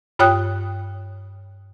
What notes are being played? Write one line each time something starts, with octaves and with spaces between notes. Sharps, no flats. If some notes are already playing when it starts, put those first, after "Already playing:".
G2 F4 C#5 G5 D#6 F#6